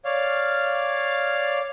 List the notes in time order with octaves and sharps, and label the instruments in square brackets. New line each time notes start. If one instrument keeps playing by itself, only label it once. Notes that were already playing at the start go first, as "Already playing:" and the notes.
[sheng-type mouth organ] C#5 D5 F5 F6